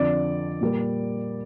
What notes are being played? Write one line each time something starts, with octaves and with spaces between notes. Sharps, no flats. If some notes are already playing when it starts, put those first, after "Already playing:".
Already playing: F2 D3 F3 D5
A#2 G3 A#3